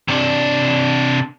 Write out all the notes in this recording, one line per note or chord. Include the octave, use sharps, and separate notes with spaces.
C3 D4